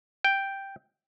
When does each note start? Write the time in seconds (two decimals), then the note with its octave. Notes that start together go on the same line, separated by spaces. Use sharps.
0.25 G5